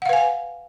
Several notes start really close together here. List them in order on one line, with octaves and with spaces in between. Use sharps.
F#5 F5 B4 G#5